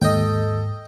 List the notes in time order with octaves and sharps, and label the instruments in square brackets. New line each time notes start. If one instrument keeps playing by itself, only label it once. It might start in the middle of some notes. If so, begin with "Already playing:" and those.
[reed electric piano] D#2 [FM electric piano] G#2 [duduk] A4 [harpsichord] D#5 G5